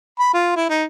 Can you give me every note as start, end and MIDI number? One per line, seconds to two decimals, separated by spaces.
0.19 0.30 83
0.34 0.55 65
0.56 0.67 64
0.70 0.84 63